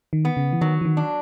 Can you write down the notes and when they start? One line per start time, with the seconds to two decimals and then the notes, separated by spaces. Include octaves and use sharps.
0.13 D#3
0.25 B3
0.37 C#3
0.52 E3
0.61 D#3 F#3
0.81 E3
0.85 D#3
0.97 D4